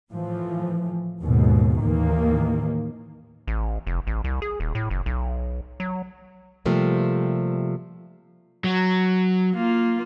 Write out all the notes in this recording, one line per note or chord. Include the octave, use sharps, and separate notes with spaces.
A2 E3 F3
D#2 G#2 B2
D#2 A2 D#3 E3 A#3
A1
F1
A1
C2
G#4
D#1
A2
F#1
B1
F#3
C3 F3 G3 A3 A#3
F#3
A#3 F4